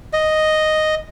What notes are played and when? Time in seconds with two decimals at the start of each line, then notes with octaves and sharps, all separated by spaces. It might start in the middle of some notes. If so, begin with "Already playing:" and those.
0.13 D#5